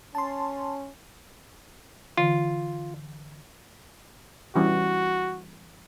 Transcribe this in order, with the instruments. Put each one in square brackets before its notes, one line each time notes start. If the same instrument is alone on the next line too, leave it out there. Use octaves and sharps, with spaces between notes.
[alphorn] C#4 [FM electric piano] A5 C6
[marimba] D3 E3 [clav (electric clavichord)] F4
[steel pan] E3 G3 C#4 [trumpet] F#4